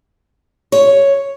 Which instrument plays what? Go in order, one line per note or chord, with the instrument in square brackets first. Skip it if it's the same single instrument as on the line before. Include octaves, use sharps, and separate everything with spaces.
[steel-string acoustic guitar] C#5